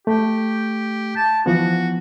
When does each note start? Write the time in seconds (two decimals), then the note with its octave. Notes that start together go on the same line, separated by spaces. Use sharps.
0.07 A3 G4
1.16 A5
1.46 E3 F3 B3 F#4